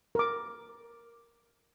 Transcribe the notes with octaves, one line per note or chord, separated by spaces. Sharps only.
A#4 D6